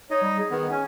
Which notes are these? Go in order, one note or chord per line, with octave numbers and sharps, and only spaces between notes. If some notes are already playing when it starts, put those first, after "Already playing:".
D#4 C#5 D#5
G3
G#4
D#3 B3
C#4 G#5